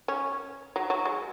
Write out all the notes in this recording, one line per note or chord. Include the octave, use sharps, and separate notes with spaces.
C#4
F#3
F#3
G#3